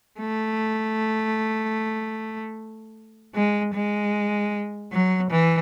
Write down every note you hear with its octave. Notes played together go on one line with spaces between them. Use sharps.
A3
G#3
G#3
F#3
E3